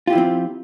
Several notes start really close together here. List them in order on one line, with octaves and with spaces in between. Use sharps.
F4 G4 E4 F3 C4